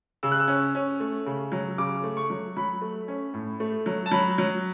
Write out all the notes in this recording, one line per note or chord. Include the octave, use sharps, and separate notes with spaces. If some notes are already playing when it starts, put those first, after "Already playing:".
C#3 E6
F#6
E6
C#4
C#4
A3
C#3
F#3
C#3 D6
A3
C#6
F#3
F#3 B5
A3
C#4
A2
A3
F#3
A5
F#3 B5
F#3